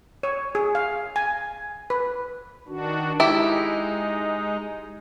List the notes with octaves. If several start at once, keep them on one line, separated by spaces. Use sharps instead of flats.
C#5
G#4
F5
G#5
B4
D#3 D4 F#4
G#3 D#4 E4 G4